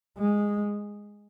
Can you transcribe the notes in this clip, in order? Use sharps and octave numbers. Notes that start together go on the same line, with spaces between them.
G#3